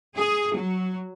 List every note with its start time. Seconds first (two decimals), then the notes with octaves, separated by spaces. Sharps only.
0.16 G#4
0.55 F#3